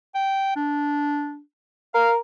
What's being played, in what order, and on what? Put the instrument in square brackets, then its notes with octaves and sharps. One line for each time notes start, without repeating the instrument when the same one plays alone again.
[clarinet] G5
D4
[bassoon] A#4 [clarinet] F5